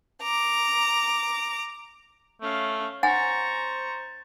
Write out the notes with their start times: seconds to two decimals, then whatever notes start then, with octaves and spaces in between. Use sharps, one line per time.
0.23 A#5 D6
2.42 A3 C#4 F5
3.03 C5 F#5 G#5 A#5 C#6 A6